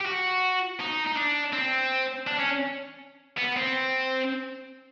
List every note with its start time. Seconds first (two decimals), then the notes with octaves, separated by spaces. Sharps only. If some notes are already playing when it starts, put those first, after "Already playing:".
0.01 G4
0.06 F#4
0.80 D#4
1.06 D#4
1.16 D4
1.53 C4
2.27 D4
2.39 C#4
3.38 B3
3.57 C4